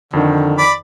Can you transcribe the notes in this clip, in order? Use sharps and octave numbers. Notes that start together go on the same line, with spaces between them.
F2 D3 D#3
D5 B5